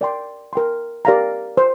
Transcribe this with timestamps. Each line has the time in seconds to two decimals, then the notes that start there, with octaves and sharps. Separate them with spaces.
0.01 A#4 D5 G5 C6
0.53 A#4 G5 C6
1.05 G4 A#4 D5 F5 A#5
1.57 C5